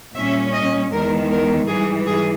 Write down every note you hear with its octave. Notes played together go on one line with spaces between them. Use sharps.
A#2 G3 C#4 E5
D#5
E2 D#3 G#3 A#4
A#4
G#2 E3 G3 G#4
G#4